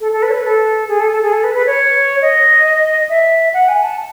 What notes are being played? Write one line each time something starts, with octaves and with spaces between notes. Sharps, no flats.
A4
A4
B4
C#5
B4
A4
G#4
A4
A4
G#4
A4
B4
B4
C#5
D#5
E5
F#5
G#5
A5